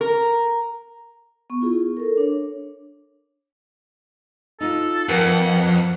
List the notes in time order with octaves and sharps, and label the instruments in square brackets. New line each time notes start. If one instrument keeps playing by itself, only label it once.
[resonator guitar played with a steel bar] A#4
[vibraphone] B3 C#6
E4 F4 G#4
A4 A#4
D4 C#5
[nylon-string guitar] D#4 F4 [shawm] A4
[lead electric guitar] F2 [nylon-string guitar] A#4 B4 A5 [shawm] F#5